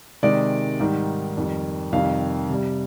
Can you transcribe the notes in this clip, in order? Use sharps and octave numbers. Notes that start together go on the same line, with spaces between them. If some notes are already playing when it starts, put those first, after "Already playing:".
C3 D#3 G#3 D5
G#2 D#3 G3
F2 D#3 G3
F2 C3 D#3 G3 F5
C3 G3